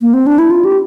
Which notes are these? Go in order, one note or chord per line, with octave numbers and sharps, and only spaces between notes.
A#3
C4
D4
E4
F4
G4